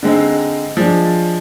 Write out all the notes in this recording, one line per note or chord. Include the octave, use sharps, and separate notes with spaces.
D3 G#3 C4 D#4
F3 G#3 D4